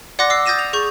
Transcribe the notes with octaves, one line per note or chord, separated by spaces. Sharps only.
D5 F#5 C6 D6 F#6 A#6
D6 E6 C7
D#6 G6 A6 A#6 D#7 E7
F7
G#4 C#6 G6